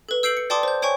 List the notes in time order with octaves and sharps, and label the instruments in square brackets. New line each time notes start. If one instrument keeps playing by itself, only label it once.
[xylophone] A4 B4
E6 G6 C7 D7 F#7
C#7
D5 G5 A5 C6 D6 D#6
C5 G6
C#5 G5 G#5 C#6